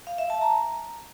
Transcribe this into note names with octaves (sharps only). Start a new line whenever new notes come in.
F5
E5
A5
A#5